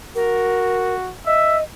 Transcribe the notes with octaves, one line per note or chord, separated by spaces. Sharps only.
F#4 A#4
D#5 E5